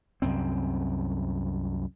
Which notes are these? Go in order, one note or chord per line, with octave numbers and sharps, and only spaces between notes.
C2 F#2 C4